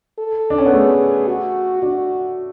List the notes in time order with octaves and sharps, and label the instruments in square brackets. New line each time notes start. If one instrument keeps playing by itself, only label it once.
[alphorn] A4
[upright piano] D4
C#4
B3
[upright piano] A3 [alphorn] G#4
[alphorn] F#4
[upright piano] D4 [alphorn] F#4